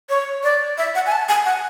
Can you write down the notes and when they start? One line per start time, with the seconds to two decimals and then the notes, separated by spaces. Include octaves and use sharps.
0.10 C#5
0.44 D5
0.78 E5
0.95 F#5
1.06 G#5
1.12 A5
1.29 G#5
1.46 F#5